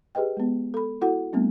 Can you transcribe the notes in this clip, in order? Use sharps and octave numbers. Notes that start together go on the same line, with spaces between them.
G4 G#4 B4 D#5 G5
G#3 B3
A4 B5
E4 F#4 A4 F#5
G3 A3 B3 C4 D4